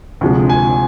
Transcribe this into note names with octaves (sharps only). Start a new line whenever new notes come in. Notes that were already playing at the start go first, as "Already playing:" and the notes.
D2 C3 F3 G#3
G#5